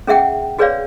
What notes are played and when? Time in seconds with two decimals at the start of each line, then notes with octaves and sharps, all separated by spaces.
0.07 C#4 G#4 E5 F#5 G5
0.59 F#4 G#4 B4 C#5 D5 F5